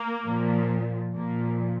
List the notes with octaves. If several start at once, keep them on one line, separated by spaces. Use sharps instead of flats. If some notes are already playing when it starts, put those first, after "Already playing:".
Already playing: A#3
A#2 F3
A#2 F3 A#3